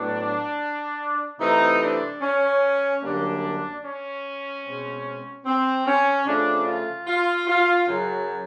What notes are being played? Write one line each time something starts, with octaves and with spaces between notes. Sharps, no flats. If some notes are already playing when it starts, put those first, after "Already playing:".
Already playing: A2 F#3 B3 D4
C3 E3 A3 C4 D#4
D4
C#4
F#2 D3 G3 A#3 D4
C#4
B2 G#3 C4
C4
C#4
C#3 F3 A3 D4
F4
F4
F4
F#2 C#3 F#3